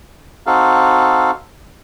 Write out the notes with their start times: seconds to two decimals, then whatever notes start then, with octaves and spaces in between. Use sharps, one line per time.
0.46 C4 D#4 F#4 A4 F5